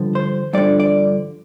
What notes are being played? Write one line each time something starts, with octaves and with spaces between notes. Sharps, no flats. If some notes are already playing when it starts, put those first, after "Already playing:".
Already playing: G2 D3 F3
C5
G2 D3 F3 D5
D5